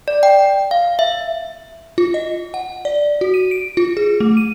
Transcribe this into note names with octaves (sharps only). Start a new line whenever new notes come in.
D5
G5
F5
E5
F4
D#5
F#5
D5
F#4
D#7
D7
F4
G#4
A3
D#7